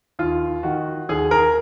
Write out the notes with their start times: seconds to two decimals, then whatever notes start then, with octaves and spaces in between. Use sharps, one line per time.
0.19 D#2 F4
0.63 D#3 F#4
1.09 D#2 G#4
1.31 A#4